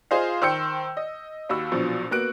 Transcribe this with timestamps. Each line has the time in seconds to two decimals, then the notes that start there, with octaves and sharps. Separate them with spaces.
0.11 F4 G#4 C5 D#5 F5
0.42 D#3 C5 G5 E6 G6 C#7
0.97 D#5
1.49 D#2 F#4 B5 E6
1.72 A#1 B2 F3 F#3
2.11 A#3 B3 F#4 F#6 D7